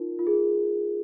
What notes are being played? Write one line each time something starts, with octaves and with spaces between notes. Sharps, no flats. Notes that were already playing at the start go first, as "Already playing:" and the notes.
Already playing: D#4 F4 A#4
F4
G#4